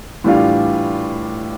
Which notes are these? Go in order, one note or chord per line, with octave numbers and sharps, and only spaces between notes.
A2 E3 G3 D4 F4